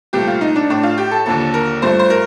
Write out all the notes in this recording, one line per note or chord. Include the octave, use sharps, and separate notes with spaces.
C2 A#2 F3 A3 G4
F4
D#4
D4
A2 A3 D4
F4
G4
A4
D#2 D3 F3 A#3 A4
A#4
G2 F3 A3 C5
C5
A#4